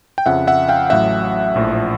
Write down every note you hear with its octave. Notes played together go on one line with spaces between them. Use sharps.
G5
F2 C#3 F3 E5 F#5
E5 F#5
F5 G5
A1 A2 F#3 E5 F#5
A#1 A2 F3